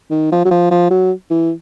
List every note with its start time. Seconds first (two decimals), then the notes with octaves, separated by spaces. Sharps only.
0.11 D#3
0.32 F3
0.45 F#3
0.51 F3
0.71 F3
0.90 F#3
1.30 E3